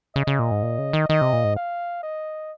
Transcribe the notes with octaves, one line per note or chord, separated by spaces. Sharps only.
C#3 D#5
C#3
A#2
G#2
A#2
C#3
D#3
D#3 D#5
C3
A#2
G#2
F5
D#5